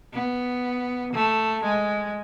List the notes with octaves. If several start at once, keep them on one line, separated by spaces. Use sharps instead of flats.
B3
A3
G#3